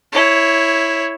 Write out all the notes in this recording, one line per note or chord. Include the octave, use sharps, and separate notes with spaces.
E4 C#5